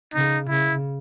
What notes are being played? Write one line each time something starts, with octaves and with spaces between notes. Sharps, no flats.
C#3 D#4
C#3 E4